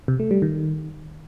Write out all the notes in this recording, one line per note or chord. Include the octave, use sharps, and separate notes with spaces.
C3
A3
G3
D#3